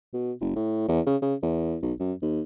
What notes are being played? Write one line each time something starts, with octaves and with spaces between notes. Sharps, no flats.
B2
F#1
A2
E2
C#3
C#3
E2
B1
F#2
D#2